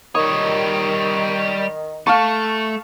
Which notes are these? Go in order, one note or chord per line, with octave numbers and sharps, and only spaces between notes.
D#3 G3 C#5 D#6
A3 F5 A5 C#6